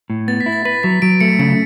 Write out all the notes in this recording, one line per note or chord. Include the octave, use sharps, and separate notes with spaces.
A2
B3 A6
B6
E4
A6
B4 B6
F#3 B6
F#3 D7
A3 C#7
C#3 C#7